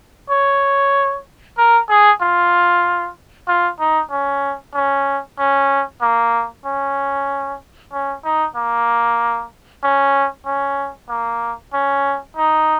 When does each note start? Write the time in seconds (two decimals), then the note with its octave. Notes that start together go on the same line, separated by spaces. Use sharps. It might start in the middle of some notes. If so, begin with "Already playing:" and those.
0.30 C#5
1.58 A#4
1.89 G#4
2.21 F4
3.48 F4
3.80 D#4
4.11 C#4
4.74 C#4
5.39 C#4
6.01 A#3
6.65 C#4
7.93 C#4
8.24 D#4
8.56 A#3
9.83 C#4
10.46 C#4
11.09 A#3
11.73 C#4
12.37 D#4